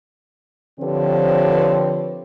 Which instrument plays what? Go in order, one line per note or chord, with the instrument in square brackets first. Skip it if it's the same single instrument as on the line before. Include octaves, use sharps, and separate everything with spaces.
[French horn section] D3 F3 C4 G4 B4 C#5